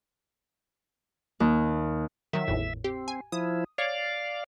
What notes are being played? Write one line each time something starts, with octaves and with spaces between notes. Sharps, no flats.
D#2
D#3 F#3 E5
G#1 E2 A2
C4 G4
G#5
F3 E4 D#6
C#5 D5 F5